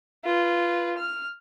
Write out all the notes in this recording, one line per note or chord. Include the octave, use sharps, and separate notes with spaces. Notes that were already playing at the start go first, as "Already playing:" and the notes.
F4 B4
F6